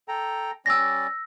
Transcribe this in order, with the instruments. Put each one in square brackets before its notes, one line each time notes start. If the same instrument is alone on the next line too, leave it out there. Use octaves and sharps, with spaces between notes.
[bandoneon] A4 G5 A#5
[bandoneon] G3 C#4 D5 [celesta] E6 A#6